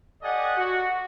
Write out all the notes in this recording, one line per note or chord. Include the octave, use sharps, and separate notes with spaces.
G4 A4 D5 D#5 F#5 G#5
F#4